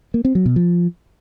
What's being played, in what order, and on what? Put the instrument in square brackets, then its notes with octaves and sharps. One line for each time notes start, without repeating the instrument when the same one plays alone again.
[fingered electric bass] A#3
C4
F#3
B2
F3